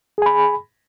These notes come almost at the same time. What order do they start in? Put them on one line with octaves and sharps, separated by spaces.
G#4 G#5 B5